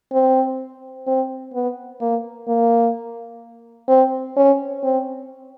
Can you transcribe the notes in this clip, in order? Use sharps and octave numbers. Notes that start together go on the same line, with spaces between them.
C4
C4
B3
A#3
A#3
C4
C#4
C4